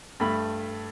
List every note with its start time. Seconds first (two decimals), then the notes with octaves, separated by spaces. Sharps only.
0.20 G2 A3 B5